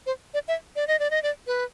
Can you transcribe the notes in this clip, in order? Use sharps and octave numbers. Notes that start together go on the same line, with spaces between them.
C5
D5
E5
D5
D#5
D5
D#5
D5
B4